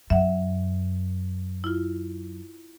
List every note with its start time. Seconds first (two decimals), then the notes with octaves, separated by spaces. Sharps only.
0.10 F#2 E5 F#5
1.64 E4 F4